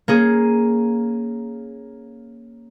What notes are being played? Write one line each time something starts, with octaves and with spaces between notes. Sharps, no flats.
A#3 C#4 G#4